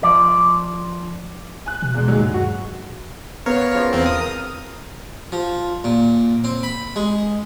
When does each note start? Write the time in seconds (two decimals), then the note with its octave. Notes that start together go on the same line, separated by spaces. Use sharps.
0.03 F3 D5
1.66 G#5 F#6
1.82 B2
1.94 E2 G#3
2.08 D#2 F#3 G#3
2.21 G2
2.34 F#4
3.46 B3 A#4 C#5 F5
3.74 F#2 C#3 F3
3.93 E2 C4
4.06 D#6
5.32 F3
5.84 A#2
6.44 C4
6.63 B5
6.96 G#3